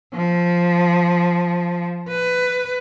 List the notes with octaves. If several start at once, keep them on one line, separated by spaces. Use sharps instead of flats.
F3
B4